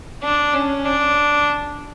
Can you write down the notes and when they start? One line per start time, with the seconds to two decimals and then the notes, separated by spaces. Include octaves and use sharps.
0.23 D4
0.53 C#4
0.85 D4